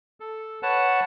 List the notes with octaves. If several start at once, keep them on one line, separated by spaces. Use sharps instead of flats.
A4
B4 C#5 F#5 A5